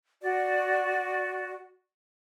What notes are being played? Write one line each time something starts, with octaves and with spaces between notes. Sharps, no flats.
F#4 D5